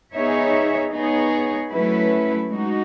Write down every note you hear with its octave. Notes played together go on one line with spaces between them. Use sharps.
B3 D#4 G#4 C#5 E5
B3 D#4 G#4 C#5
F#3 A3 C#4 E4 B4
G#3 D#4 F#4